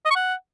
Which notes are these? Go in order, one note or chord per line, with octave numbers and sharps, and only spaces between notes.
D#5
C#6
F#5